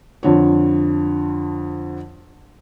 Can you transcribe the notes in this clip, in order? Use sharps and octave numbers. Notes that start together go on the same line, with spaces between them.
F2 D3 C#5